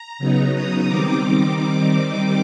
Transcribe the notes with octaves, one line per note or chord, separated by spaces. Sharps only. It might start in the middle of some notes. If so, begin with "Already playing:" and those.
Already playing: A#5
C#3 F#3 B3 D#4
D#6
D#3 G3 C4 D#4 D6